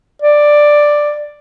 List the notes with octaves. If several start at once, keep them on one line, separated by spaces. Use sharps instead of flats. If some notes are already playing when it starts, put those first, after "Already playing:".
D5